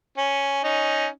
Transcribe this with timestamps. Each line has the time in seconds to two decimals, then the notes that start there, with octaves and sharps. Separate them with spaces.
0.17 C#4
0.64 C#4 D#4